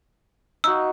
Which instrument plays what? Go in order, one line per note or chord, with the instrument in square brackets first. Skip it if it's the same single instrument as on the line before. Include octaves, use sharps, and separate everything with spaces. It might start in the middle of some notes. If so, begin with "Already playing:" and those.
[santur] D#4 F#4 [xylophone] E6